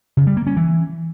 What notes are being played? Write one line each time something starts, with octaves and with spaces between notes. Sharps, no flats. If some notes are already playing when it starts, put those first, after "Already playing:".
C#3
G3
A#3
C#4
E3